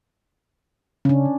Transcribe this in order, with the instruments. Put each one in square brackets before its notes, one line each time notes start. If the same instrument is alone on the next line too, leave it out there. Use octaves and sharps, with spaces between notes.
[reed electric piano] C#3 [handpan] C#4 D4